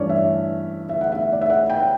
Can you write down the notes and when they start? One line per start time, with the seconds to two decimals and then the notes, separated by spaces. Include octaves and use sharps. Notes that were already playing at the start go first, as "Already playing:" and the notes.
Already playing: G2 E3 A3 C#4 C#5 D5
0.09 E5
0.89 E5
1.01 F#5
1.12 E5
1.32 D5
1.41 E5
1.50 F#5
1.70 G5